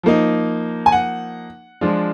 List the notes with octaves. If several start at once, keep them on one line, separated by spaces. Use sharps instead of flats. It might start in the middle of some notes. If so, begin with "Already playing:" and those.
F3 A#3 D#4
G#5
F#5
F3 G#3 D4 F4